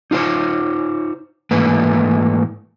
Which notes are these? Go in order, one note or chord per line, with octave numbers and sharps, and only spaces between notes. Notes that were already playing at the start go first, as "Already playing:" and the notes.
D#4 F4 A4 C5 C#5
G#2 E3 A3 A#3 B4